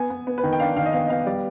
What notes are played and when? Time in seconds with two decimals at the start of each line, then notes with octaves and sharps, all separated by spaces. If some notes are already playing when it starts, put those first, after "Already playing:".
Already playing: B3 G#5
0.10 B3
0.27 B3
0.38 B4
0.44 D#3
0.53 G5
0.60 D4 F5
0.77 D#3 F5
0.86 D#5
0.93 B3 F5
1.06 D#5
1.10 B3 F5
1.26 G3 D5